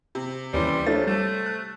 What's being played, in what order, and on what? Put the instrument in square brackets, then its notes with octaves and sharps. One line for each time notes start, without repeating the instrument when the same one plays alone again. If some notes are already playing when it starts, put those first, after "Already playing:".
[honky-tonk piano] C3
[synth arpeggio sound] D#2 C#4 C6 [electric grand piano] E3 E4 B4 [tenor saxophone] G3
[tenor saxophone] F3 [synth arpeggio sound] A3 D4 E4 [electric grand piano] C5 C#5 A6
[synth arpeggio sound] G3 [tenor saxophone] A3
[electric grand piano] F#6